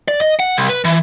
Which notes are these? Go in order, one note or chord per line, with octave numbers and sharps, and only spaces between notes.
D5
D#5
F#5
C2
B4
E3